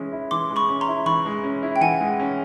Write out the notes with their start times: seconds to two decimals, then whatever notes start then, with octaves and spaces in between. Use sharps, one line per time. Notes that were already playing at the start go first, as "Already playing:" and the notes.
Already playing: E3 G#3 C#4
0.12 E4
0.31 E3 C6 D6
0.50 G#3
0.56 B5 C#6
0.69 C#4
0.81 A#5 C6
0.88 E4
1.06 E3 B5 C#6
1.26 G#3
1.44 C#4
1.62 E4
1.76 G5
1.81 E3 F#5 G#5
2.01 G#3
2.20 C#4